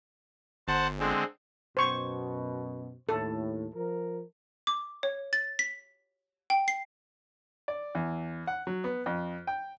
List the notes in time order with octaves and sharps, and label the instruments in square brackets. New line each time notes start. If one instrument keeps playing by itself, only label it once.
[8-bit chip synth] G1 [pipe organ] C5 F#5 A5
[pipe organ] D3 G#3 C4
[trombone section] F#2 B2 [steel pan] C5 C#6
[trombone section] D#2 A2 [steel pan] A4
[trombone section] F3 A#4
[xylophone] D6
C#5
A6
B6
G5
C7
[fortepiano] D5
E2
F#5
F#3
B3
F2
G5